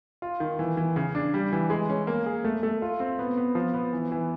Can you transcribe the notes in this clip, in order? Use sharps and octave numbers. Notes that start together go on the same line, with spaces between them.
F4
D#3
E3
E3
C#3
D4
G3
E3
G#3
C#4
A#3
G#4
A3
A3
F4
C4
B3
B3
F3
B3
E3
E3